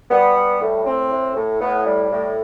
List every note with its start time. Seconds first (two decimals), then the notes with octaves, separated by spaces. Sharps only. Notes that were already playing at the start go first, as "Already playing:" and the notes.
0.11 G3 B3
0.36 G3
0.61 A2
0.86 A2 C4
1.11 A2
1.36 A2
1.61 A2 B3
1.86 G3
2.11 A2